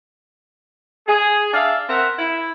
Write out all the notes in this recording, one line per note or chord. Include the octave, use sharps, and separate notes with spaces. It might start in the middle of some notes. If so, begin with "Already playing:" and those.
G#4
D4 E5 F5
C4 A#4 E5 F#5
E4